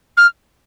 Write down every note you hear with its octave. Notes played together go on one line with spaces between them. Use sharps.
F6